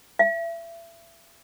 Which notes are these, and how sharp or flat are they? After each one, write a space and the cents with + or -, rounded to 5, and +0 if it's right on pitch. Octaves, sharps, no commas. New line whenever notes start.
E5 +30